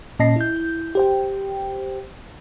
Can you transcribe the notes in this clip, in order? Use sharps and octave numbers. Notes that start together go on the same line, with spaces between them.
A#2 C#4 D#5 A5 A#6 C7
E4 G6
G4 C5 G5